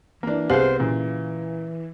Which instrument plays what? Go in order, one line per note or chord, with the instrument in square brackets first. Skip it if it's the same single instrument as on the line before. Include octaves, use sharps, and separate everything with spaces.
[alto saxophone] E3 [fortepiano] A#3 D4
[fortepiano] C2 B3 F5 [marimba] G4 G#4 [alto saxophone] C5
[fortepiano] A#2 C#3 [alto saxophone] E3